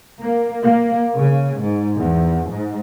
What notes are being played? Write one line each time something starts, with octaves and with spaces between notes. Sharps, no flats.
A#3
A#3
C#3
G#2
E2
G#2